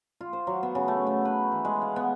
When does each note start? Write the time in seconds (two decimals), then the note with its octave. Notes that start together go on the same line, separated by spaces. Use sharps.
0.21 F4
0.33 C5
0.47 F#3
0.63 B3
0.75 C#3
0.88 A3
1.07 B3
1.25 B4
1.52 E3
1.65 G#3
1.82 F5
1.96 B3